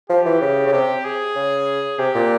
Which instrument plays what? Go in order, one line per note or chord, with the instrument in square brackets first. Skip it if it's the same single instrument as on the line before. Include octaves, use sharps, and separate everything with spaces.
[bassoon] F3 [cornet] G4
[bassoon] E3
C#3
C#3
[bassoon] C3 [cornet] G4
[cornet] G#4
[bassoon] C#3
[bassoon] C3 [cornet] G4
[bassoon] A#2